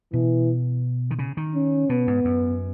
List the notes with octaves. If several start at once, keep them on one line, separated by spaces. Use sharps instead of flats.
B2 E3
D#3
C#3
D#3
C#4
B2 B3
G#2
F#2